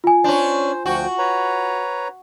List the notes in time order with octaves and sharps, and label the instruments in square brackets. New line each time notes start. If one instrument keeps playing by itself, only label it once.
[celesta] F4 G#5
[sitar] C#4 D4 [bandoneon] C5
[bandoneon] D2 F3 G5 [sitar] F#4
[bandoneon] B4 C#5 A#5